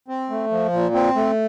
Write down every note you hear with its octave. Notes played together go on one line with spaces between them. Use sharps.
C4
A3
F3
A#2
C4
A3